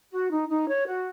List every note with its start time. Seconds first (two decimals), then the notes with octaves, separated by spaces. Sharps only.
0.12 F#4
0.31 D#4
0.48 D#4
0.68 C#5
0.86 F#4